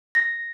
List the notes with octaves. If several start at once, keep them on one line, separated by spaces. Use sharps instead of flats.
A#6